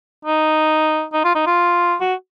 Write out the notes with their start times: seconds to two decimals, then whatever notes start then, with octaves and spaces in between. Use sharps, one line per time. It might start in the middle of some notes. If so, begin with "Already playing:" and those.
0.25 D#4
1.13 D#4
1.24 F4
1.35 D#4
1.46 F4
2.01 F#4